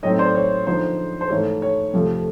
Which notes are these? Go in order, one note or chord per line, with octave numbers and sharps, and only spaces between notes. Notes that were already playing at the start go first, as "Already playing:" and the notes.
A2 F#3 A3 C4 D#4 C#5 D#5
C5 D5
C#5
D3 F3 G#3 B3 D#4 C5
C5
G#2 E3 A3 C#5
C#5
F2 C3 F3 A3